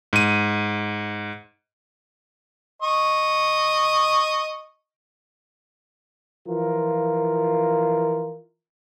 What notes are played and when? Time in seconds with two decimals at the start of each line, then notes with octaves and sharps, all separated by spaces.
0.13 G#2 D#7
2.82 D#5 C#6
6.47 E3 F3 F4 A#4